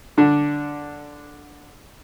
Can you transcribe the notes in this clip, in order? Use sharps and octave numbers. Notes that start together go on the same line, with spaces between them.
D3 D4